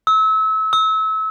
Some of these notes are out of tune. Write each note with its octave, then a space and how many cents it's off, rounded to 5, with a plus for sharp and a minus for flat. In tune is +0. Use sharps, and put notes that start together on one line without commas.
E6 -30
E6 -30